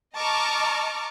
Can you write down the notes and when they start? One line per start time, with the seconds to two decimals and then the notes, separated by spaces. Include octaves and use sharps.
0.15 D#5 A5 A#5 C#6 D6 F6